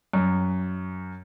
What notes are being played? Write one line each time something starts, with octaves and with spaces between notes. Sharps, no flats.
F#2